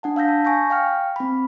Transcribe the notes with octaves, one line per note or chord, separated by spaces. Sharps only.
D4 F#5 A5
F5 E6 G6 A#6 B6
A5
G#5 C#6 G6 A#6
F5 G5 F6
C4 B5